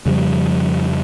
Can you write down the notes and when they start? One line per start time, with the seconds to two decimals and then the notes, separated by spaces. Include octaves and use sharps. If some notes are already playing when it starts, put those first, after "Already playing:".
0.06 F2 C#3 F3 G3